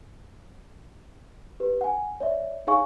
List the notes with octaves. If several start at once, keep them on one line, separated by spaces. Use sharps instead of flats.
G4 B4
F#5 G#5
C#5 D5 E5
D#4 G#4 C#5 F5 G#5 C#6